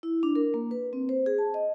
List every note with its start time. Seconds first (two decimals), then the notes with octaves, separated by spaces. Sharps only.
0.03 E4
0.23 D4
0.36 A#4
0.54 A#3
0.71 B4
0.93 C4
1.09 C5
1.26 G#4
1.38 A5
1.54 D#5